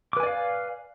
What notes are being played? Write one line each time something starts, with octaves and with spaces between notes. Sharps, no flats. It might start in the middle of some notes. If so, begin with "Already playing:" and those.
B4 D5 F5 G#5 D6